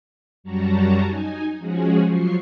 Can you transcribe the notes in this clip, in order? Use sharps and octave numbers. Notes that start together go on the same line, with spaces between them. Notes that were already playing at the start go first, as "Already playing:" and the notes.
F#2 F#3 G3 F#4 A5 A#5
D#4 G#5
F3 G#3 C#4 F#4 G#4
F3 F#3 C#6 C7